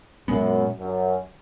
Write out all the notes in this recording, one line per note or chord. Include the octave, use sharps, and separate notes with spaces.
F#2 A#2 G#3 B3
F#2